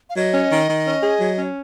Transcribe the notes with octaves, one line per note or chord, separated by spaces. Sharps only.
F5
F#3 D#5
C#4
D#3
D#3
C#4
G#4
F#3
C#4